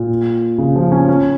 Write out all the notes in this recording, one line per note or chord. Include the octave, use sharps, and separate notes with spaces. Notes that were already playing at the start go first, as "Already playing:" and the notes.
Already playing: A#2
C#3
F3
C#4
C#4